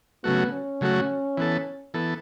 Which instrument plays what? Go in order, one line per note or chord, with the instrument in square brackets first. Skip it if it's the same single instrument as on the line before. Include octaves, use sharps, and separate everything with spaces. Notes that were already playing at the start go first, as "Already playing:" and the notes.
[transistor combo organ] C#3 F#3 A3 F#4 [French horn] B3
[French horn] C#4
[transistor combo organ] C#3 F#3 A3 F#4
E3 B3 A4
E3 B3 A4